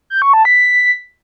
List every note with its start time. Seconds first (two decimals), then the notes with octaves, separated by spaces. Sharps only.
0.10 G6
0.22 C#6
0.33 A5
0.45 B6